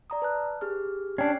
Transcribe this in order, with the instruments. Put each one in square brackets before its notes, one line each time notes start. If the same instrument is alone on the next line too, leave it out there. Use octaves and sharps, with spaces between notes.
[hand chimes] D5 A#5 D#6
B4 A5 F#6
G4 G#4 F6
[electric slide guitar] C#4 D4 [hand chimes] G5 C7